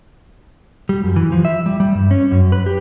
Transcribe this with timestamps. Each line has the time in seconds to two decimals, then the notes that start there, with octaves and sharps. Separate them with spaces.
0.89 G3
1.04 F#2
1.16 E3
1.32 F3
1.45 E5
1.66 G3
1.80 G3
1.95 G2
2.11 C#4
2.31 F#2
2.52 B4
2.66 G4